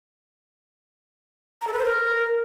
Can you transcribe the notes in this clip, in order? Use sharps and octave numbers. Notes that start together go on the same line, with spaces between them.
A#5
A4
B4
C5
A#4